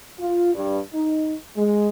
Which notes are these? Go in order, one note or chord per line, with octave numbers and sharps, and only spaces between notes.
F4
G2
D#4
G#3